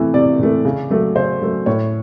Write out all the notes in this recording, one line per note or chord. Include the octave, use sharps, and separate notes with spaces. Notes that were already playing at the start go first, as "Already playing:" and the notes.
Already playing: C3 E3 A3
C3 D5
E3 A3
C#3
F#3 A3
C#3 C5
F#3 A3
A2 C#5